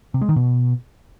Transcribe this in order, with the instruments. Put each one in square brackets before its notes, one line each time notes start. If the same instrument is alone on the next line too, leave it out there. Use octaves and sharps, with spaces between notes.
[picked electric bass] C3
G#3
D#3
B2